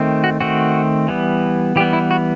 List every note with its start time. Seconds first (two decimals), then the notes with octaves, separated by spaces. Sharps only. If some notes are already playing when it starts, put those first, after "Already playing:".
Already playing: D#3 A3 C4
0.24 F#4
0.40 D#3 A3 C4 F#4
1.08 E3 G3 B3
1.76 E3 G3 B3 G4
1.93 E4
2.11 F#4